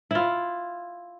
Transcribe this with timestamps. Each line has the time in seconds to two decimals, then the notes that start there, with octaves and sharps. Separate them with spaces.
0.11 E4 F4